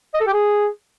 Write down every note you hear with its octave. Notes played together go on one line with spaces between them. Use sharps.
D#5
A4
G4
G#4